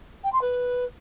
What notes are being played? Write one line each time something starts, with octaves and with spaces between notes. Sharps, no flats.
G5
C6
B4